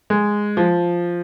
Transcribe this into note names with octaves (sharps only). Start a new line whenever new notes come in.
G#3
F3